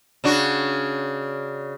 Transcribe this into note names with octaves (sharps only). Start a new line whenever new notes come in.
C#3 D4 F#4